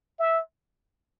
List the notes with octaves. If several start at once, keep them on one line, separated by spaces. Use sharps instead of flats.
E5